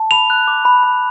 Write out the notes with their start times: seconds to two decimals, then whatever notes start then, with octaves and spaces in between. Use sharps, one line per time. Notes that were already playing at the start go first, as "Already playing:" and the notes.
Already playing: A5
0.11 B5 F7
0.30 F#6
0.48 D6
0.65 B5
0.83 B5